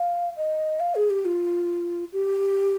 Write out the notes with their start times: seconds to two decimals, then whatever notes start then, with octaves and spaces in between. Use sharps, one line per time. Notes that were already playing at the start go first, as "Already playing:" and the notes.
Already playing: F5
0.37 D#5
0.80 F5
0.95 G#4
1.10 G4
1.25 F4
2.13 G4